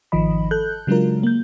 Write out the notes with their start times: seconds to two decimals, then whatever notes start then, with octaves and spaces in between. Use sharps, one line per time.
0.12 G#1 D#3 F3 D#5 B5
0.51 A4 F#6 G6
0.87 C#3 F#3 G#3 D4 F4 A#4
1.23 A#3 G6